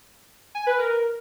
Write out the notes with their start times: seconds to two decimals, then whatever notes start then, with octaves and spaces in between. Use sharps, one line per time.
0.55 G#5
0.67 B4
0.78 A#4